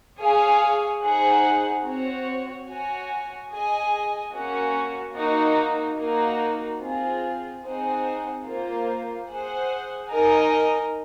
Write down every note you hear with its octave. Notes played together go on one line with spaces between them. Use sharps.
G#4 C#5 F5 G#5
D#4 G#4 C5 F#5
C4 F#4 C#5
F#4 C#5 G#5
G#4 D#5 G#5
A#3 C#4 F#4
A#3 D#4 F#4
A#3 D#4 F#4
C4 F4 G#4
C4 D#4 G#4 C5 F#5
A#3 F4 C5
G#4 C5 F#5
D#4 A#4 D#5 G#5